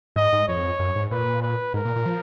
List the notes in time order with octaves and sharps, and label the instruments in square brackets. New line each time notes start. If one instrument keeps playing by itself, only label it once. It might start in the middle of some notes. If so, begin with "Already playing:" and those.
[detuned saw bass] G#2 [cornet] D#5
[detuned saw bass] G#2
[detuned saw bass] F2 [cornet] C#5
[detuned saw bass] F#2
G#2
[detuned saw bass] A#2 [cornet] B4
[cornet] B4
[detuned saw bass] G#2 [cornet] A#4
[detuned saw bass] A#2
A#2
F3